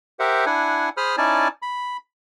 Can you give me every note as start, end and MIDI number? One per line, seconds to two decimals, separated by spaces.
0.20 0.45 67
0.20 0.45 70
0.20 0.45 72
0.20 0.45 76
0.20 0.45 78
0.46 0.89 62
0.46 0.89 64
0.46 0.89 78
0.46 0.89 80
0.97 1.16 68
0.97 1.16 72
0.97 1.16 83
0.97 1.16 87
0.97 1.16 89
1.18 1.48 61
1.18 1.48 63
1.18 1.48 64
1.18 1.48 74
1.18 1.48 80
1.18 1.48 81
1.62 1.97 83